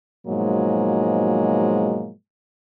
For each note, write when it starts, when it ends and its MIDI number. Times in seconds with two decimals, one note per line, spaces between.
0.27 2.11 44
0.27 2.11 47
0.27 2.11 53
0.27 2.11 54
0.27 2.11 56
0.27 2.11 58